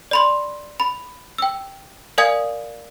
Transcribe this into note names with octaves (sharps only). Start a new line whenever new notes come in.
D5 B5 C6
B5
G5 E6
A#4 D5 F5 G#5 D#6 G#6